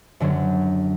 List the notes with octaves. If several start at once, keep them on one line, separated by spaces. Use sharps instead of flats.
F#2 D3 F#3